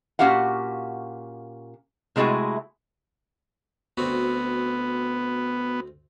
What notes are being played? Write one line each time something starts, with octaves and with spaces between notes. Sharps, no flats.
A#2 C#4 F#4 G4 F5 F#5
C3 G#3 A3 E4 F#4 G#5
D2 B3 C4 F#4